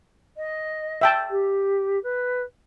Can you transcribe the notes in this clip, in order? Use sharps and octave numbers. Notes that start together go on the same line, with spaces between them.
D#5
E5 G5 A5
G4
B4